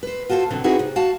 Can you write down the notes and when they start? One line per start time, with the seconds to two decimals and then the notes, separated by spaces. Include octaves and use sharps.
0.03 B4 C5
0.29 F4 F#4 A4 B4 C5
0.50 B2 D3 F#3 C4
0.64 C4 D#4 E4 F#4 G#4 B4
0.79 C3
0.96 F#4 F5 A5